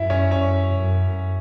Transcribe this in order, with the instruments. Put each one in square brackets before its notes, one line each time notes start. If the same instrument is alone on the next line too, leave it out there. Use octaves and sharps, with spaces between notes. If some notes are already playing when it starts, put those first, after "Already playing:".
Already playing: [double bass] F#2 [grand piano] E4 E5
[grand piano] C#4 C#5
C#4 C#5
[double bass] F#2